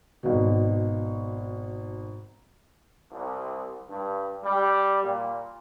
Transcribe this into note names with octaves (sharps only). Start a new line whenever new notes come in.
G#1 B2
C2
G2
G3
A#2